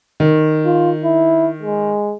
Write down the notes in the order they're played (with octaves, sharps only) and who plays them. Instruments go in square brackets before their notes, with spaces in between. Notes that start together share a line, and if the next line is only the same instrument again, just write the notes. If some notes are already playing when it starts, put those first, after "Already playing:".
[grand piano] D#3
[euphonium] F4
E4
G#3